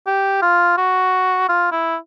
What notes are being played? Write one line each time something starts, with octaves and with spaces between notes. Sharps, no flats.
G4
F4
F#4
F4
E4